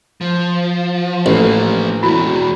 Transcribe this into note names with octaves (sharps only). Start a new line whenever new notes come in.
F3
A1 F3 A#3
E2 G#3 E4 F#4 B5